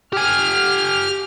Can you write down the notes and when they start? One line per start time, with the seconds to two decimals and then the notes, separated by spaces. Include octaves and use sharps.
0.13 G4 G#5 F6